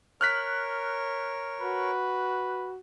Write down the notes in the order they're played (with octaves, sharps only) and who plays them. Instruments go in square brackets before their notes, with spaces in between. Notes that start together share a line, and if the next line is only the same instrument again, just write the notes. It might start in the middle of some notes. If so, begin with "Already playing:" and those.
[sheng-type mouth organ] A#4 C#5 [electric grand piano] F6 F#6 B6
[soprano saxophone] F#4 [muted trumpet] B4